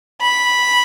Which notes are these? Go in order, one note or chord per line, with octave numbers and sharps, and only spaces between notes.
B5